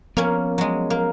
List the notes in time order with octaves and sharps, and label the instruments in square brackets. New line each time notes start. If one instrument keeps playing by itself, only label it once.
[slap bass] F3 B3 [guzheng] A#3 C#4
[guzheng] F#3 G#3
A#3